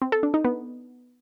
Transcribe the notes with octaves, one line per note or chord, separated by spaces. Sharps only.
C4
A4
D4
D#4
B3